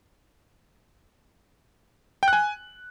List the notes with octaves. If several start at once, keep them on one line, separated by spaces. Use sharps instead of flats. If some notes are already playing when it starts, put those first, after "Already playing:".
G5
F#6
G#5